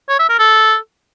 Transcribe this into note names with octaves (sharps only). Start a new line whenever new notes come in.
C#5
E5
A#4
A4